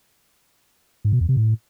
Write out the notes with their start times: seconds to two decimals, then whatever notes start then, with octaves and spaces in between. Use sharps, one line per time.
1.05 G#2
1.13 B2
1.21 E2
1.29 C3
1.37 A2